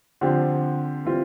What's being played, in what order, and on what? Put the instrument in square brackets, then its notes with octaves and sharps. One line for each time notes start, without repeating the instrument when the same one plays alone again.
[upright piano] D3 F3 C4 G4
E3 G3 C4 F4